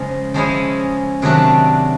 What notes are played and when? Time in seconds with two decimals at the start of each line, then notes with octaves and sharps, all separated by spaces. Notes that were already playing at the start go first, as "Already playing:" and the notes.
Already playing: C#3 F3 G#3
0.34 F3 G#3 C#4 E4 G#4
1.22 C3 D#3 F#3 A3 D4